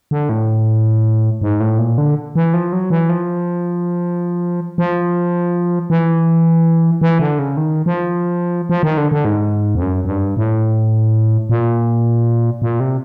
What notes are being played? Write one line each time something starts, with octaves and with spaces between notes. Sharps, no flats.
D3
A2
G#2
A2
A#2
D3
E3
F3
F#3
E3
F3
F3
E3
E3
D3
C#3
D#3
F3
F3
D#3
D3
D3
G#2
F2
F#2
F#2
G2
A2
A#2
A#2
C3